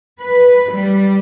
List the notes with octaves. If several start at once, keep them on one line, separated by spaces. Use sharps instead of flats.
B4
G3